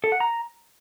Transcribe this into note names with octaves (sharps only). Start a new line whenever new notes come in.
A4
F#5
A#5